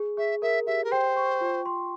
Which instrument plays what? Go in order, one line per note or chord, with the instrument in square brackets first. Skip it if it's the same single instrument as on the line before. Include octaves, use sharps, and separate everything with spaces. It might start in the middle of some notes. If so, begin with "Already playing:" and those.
Already playing: [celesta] G#4
[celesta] G#4 [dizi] E5
[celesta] A#4 [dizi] E5
[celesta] G4 [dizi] E5
[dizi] A#4
[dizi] C5 [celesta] G5
[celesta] C#6
F4
C6